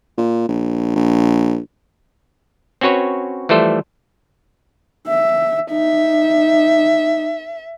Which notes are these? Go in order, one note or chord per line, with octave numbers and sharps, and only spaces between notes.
A#2
A#1
A#1
C4 C#4 F#4 B4 C#5
E3 F3 G3 A3 A4 C5
E5
D#4 E5